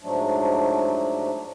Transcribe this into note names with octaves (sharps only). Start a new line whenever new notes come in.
G#2 F3 F#3 A3 D4